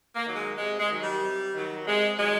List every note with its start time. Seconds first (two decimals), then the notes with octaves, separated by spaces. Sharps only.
0.15 A#3
0.26 D#3 F#3
0.36 G#3
0.58 C3 G#3
0.79 G#3
0.90 D#3 F#3
1.01 G3
1.22 C3
1.54 D#3 F#3
1.86 C3 G#3
2.18 D#3 F#3 G#3